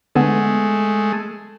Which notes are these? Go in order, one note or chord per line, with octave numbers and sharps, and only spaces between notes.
D3 G#3 A3 B3